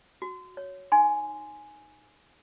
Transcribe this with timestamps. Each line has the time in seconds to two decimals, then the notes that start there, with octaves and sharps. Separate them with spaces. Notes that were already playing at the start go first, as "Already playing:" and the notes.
0.22 F#4
0.57 C#5
0.92 D#4 G#5 C6